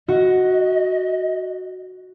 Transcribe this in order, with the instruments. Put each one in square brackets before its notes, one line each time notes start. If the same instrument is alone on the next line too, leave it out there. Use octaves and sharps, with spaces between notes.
[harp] F#4 [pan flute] D#5